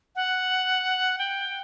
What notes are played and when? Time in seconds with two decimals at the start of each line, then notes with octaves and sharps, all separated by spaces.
0.16 F#5
1.19 G5